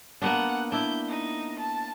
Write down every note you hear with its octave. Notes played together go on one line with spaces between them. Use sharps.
A#3 B3 D4 F#5
D4 E4 G6
D#4
A5